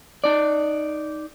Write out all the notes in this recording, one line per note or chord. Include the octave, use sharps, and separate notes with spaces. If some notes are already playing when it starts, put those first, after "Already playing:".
D#4 D5